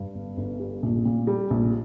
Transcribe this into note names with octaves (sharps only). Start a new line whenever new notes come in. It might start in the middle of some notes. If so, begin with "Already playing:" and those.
Already playing: G2
G1
G1
G3
A#1
A#2
G3
A#1